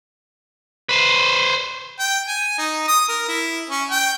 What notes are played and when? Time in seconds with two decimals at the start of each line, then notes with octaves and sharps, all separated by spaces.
0.89 B4 C5
1.99 G5
2.27 G#5
2.58 D#4
2.88 D#6
3.08 A#4
3.28 E4
3.69 C#4
3.90 G5